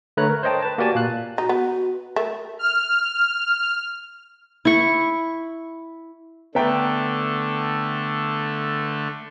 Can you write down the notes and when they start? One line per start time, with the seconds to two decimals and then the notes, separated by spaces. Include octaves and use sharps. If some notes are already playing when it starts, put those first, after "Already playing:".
0.17 D3 A3 B4 C#5 A#5 F#6
0.29 A#4
0.43 C5 C#5 D#5 G5 A5
0.62 B4 A5
0.78 A#3 F#4 G4 D5 G#5 A5
0.95 A#2 F5 F#6
1.38 D#4 F#4
1.49 B3
2.16 A3 A#4
2.59 F6
4.65 E4 C#6
6.55 D3 A3 B3 E5 G5